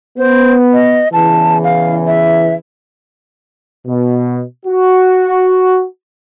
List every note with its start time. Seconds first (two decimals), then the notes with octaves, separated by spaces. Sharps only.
0.18 B3 C5
0.73 D#5
1.13 E2 C#3 E3 A5
1.64 F5
2.07 E5
3.86 B2
4.65 F#4